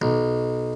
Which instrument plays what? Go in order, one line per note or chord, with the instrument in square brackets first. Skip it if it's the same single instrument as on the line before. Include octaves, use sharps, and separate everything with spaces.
[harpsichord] B1